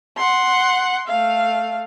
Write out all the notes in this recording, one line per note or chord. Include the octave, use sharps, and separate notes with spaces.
F#5 C6
A3 F5